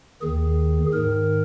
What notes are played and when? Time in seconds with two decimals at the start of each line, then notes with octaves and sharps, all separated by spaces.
0.22 D#2 D#3 G#4
0.93 G#2 D#3 A#4